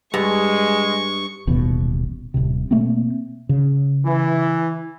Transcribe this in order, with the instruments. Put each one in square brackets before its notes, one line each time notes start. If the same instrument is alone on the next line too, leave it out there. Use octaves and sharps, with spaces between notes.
[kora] G2 [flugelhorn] G#3 [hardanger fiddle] C#6
[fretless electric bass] D#1 A1 D#2 B2
D#1 A#1 A2 C3
B2 A3 A#3 C4
C#3
[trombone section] E3